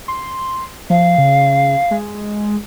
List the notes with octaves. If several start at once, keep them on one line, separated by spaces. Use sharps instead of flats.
C6
F3 F5
C#3
G#3